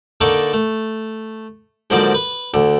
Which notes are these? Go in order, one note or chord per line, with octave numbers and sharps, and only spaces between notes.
D3 A#3 D#4 A4 D5 C#6
A3
G#2 D3 F3 F#3 A#3 D5
B4
D2 D3